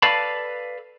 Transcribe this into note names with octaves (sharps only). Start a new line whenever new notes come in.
A4 B4 D5 F5 A5 B5